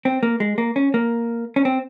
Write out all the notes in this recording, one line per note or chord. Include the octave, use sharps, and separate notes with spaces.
C4
A#3
G#3
A#3
C#4
A#3
C#4
C4